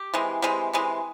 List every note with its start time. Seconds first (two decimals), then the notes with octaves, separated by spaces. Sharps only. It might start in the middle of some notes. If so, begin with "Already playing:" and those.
Already playing: G4
0.14 C3 E3 G#3
0.42 C3 E3 G#3
0.73 C3 E3 G#3